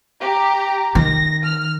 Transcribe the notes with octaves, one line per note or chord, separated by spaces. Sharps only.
G4 A#5
D#3 A#6
F6